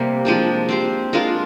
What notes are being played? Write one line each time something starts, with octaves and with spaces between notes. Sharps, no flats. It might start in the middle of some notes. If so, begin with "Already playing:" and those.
Already playing: C3 G3 A#3
F3 G#3 D4 G4
C4 G4 C5
G#3 D4 F4 A#4